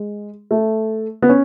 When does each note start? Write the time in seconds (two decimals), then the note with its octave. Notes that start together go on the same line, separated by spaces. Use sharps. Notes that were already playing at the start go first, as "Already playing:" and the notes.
Already playing: G#3
0.51 A3
1.22 B3
1.29 C#4